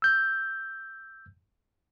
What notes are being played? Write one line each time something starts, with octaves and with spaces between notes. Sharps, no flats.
E6 G6